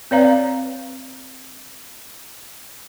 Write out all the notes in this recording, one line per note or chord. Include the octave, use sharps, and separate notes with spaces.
C4 B4 C#5 D5 F5 A#5